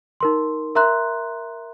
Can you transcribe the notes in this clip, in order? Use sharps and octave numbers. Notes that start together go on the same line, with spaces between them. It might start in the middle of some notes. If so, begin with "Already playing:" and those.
D#4 A#4 C6
A#4 E5 A#5 C6 F#6